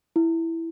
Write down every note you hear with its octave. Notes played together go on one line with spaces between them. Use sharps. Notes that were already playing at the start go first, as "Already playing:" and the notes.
E4